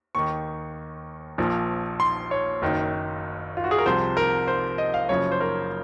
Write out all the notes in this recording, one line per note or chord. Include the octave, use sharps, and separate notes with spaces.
D#2 D#3 C#6
A#1 A#2 F3
C6
C#5
F#1 F#2 D#3
F4
F#4
G#4
A#4
C2 C3 F3 C5
A#4
C5
D#5
F5
F#1 F#2 C#3 F3 C#5
C5
A#4